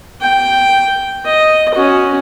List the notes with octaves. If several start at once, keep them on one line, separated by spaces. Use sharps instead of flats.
G5
D#5
C#4 F#4